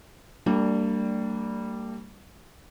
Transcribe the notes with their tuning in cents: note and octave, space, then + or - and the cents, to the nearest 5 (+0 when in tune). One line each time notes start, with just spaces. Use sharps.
G3 -5 A#3 -40 D4 +0